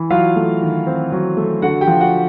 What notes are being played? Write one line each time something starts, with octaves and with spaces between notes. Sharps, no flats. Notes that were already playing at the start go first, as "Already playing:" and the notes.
Already playing: E3
F#3 F4 F5
A3
D#3
C4
F#3
A3
D3 F#4 F#5
G4 G5
F3
F#4 F#5